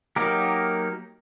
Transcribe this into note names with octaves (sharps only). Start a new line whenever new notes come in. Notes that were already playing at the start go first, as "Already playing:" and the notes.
F#3 A#3 D#4 G4 A#4